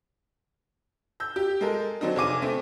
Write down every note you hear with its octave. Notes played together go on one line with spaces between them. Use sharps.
E6 G6
G4
G#3 A4 A#4
D3 F#3 C4 D4 D#4
F1 G#4 D6 D#7
A3 C4